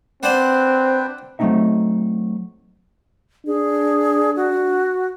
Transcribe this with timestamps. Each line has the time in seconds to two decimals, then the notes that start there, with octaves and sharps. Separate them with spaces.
0.23 C4 D4 B4 C5 D5 F#5 G5
1.39 F#3 A3 A#3 C4 D#4 E5
3.47 D4 G#4
4.36 F#4